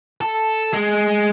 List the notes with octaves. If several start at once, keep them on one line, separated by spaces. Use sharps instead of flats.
A4
G#3